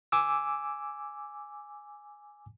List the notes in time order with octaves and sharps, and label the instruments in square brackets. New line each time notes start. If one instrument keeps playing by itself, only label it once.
[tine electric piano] G#5 D6 E6